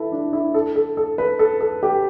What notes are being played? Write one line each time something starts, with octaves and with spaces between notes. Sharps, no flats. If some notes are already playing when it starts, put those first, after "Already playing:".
Already playing: E4 A4 B4
D4
E4
A4
A4
A4
B4
A4
A4
G4